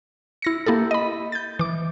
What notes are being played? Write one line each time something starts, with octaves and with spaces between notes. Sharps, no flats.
E4 A#6 C#7
A#3 E4 G4 A4
D#5 B5
G6 A6
E3 D6